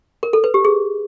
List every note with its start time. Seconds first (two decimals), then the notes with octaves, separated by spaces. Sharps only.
0.23 A#4
0.33 A4
0.44 B4
0.54 G4
0.65 G#4